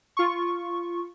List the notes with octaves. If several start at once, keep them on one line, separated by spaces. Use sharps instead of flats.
F4 C#6